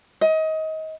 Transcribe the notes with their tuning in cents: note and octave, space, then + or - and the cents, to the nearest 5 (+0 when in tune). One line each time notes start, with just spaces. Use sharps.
D#5 +25